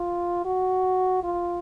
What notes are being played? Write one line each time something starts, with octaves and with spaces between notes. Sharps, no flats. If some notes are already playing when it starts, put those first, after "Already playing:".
Already playing: F4
F#4
F4